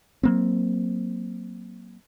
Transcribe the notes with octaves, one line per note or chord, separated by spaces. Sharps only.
F#3 A#3 C4